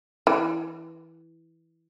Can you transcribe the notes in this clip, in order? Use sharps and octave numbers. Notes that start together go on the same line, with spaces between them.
E3